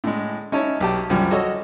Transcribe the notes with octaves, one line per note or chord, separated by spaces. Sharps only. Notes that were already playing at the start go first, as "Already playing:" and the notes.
A2 G#3
C#4 D#4 E4 C#5 A5
B1 G4 A5
C2 F#2 F3 G3
F#4 A4 C#5 D#5